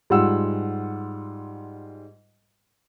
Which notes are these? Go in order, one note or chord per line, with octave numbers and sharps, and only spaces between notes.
G#2 G3 F4 F#5 E6